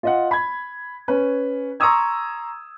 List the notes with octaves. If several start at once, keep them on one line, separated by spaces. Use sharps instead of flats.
F4 D#5 F#5
B5 G#6
C#4 B4
A#5 C6 C#6 D#6 E6 G#6